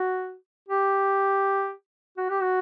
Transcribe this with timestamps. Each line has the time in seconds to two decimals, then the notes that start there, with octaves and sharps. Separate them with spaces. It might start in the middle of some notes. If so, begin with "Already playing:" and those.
Already playing: F#4
0.68 G4
2.17 F#4
2.30 G4
2.42 F#4